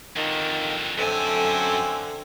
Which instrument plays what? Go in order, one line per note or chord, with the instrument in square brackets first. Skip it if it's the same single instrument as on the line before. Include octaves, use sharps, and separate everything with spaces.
[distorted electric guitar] F2 D3 [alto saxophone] D#3
[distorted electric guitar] F#2 G#5 [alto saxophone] D3 [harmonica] C4 C#4 E5 [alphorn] A4